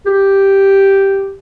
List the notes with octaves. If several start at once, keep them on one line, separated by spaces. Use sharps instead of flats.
G4